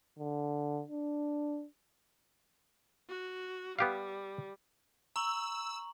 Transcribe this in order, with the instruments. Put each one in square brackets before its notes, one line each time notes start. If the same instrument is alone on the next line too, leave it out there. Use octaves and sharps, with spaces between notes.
[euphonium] D3
D4
[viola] F#4
[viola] G3 [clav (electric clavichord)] B3 G4 F5
[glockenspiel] A#5 C#6 F#7 [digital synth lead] E6